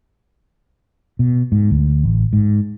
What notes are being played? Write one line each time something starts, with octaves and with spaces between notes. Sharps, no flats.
B2
G#2
D2
A1
G#2